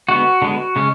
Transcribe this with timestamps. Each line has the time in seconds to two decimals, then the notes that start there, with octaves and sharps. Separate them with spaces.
0.09 D3 G#3 B3 F#4
0.42 D3 G#3 B3
0.76 C#3 G#3 C#4